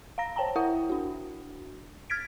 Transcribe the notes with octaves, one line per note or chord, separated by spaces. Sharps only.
F5 A#5 A#6
C5 C#5 G5 A5 A#5
E4 A#4 E5 F#5 D#6
D4 F#4
F6 G#6 A6 B6 D7